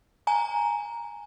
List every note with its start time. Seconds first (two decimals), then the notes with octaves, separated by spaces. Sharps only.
0.27 G#5 A#5